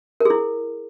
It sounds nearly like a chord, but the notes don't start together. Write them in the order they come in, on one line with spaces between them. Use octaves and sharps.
A#4 G#4 E4